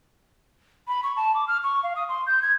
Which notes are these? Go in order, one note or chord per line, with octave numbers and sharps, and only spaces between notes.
B5
C#6
A5
D6
F6
C#6
F5
D#6
C6
G6
G#6